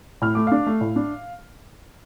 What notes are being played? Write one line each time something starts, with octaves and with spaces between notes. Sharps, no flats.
A2 F6
A3 D6
D4 F5 F6
A3
A2
D4